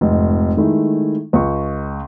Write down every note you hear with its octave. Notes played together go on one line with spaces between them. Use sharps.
F1 F2 G#2
D#3 G#3 A3 D#4 E4
C#2 C#6